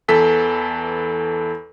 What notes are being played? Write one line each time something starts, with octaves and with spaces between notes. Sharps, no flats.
E2 E3 A4 B6